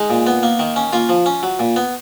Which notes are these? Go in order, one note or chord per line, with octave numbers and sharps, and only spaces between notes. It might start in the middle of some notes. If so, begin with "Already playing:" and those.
Already playing: G#3 D#4
A#2
B3
A#3
D#3
C#4
A#3 F4
F3
C#4
F#3
A#2
B3